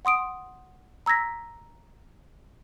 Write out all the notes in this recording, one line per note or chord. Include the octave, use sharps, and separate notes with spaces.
F#5 C6 D#6 D7
A#5 E6 G#6 A#6 B6